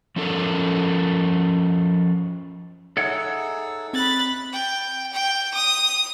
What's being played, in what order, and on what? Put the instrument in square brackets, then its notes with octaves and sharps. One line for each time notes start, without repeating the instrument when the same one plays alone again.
[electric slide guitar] F3 C#4 A4 A#4
[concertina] D#4 G#4 E6 [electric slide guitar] A4 C#5 F#5 [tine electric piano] E5
[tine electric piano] C4 [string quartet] B5 F#6 A6
[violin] G5
G5
D#6